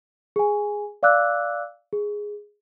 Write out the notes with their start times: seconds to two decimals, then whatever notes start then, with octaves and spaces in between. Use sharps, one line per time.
0.36 G#4 G#5
1.03 D5 F5 D6 E6 F#6
1.93 G#4